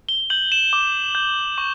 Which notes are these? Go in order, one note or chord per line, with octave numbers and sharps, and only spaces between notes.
G7
G6 F#7
E7
D6
G6
C#6